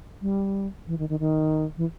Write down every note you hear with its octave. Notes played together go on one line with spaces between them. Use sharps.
G3
E3
D#3
D#3
D#3
E3